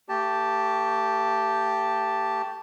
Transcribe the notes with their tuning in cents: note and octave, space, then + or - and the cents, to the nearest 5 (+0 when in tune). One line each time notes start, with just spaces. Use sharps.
A3 +35 G4 +0 A5 +0